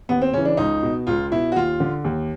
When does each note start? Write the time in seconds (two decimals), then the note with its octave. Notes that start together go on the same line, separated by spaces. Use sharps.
0.09 D#2 B3
0.21 C4
0.33 C#3 C#4
0.38 E3
0.45 D4
0.57 C#2 D#4
0.83 B2
1.07 C#2 F4
1.31 B2 E4
1.52 F#4
1.56 D#2 F4
1.80 D3
2.04 D#2